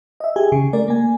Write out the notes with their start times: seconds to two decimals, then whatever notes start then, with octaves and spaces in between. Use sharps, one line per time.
0.20 D#5 E5
0.36 G4 G#4 G#5
0.52 C#3
0.73 A3 A#4 D5
0.88 A#3 G#5